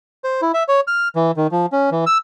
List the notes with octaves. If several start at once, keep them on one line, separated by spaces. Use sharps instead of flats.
C5
E4
E5
C#5
F6
E3
D#3
F3
C#4
E3
E6